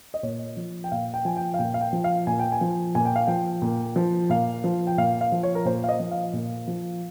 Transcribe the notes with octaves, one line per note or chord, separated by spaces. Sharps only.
D#5
A#2 C#5
F3
G5
A#2 F5
G5
F3 G#5
G5
F5
A#2 G5
F5
G5
F3
F5
A#2 G#5
G5
G#5
F3
A#2 G#5
G5
F5
F3 G5
A#2
F3
A#2 F5
F3
G5
A#2 F5
F5
F3
C#5
A#4
A#2 C5
F5
D#5
F3
F5
A#2
F3